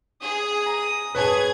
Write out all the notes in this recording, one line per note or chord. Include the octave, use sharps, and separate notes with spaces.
G#4 D#6
A#5
F#2 G#4 B4 C#5 A5 G#6